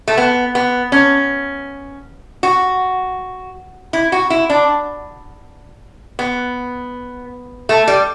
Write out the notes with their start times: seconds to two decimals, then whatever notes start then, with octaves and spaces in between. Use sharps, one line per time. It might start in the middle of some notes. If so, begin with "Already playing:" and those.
0.08 A3
0.18 B3
0.55 B3
0.92 C#4
2.43 F#4
3.93 E4
4.12 F#4
4.30 E4
4.50 D4
6.19 B3
7.69 A3
7.88 G3